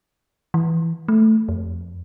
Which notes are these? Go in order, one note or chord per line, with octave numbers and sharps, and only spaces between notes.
E3
A3
F2